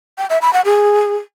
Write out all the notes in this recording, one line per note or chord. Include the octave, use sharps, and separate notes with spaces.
G5
E5
B5
F#5
G#4